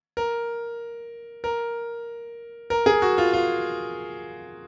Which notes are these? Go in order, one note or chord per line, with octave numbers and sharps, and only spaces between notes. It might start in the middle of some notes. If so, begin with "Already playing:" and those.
A#4
A#4
A#4
G#4
F#4
F4
F4